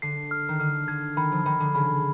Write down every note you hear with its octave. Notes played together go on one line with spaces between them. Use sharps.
D3 C7
F6
D#3
D3 F6
D3 G#6
D#3 B5
F3
D#3 B5
D3
C#3 B5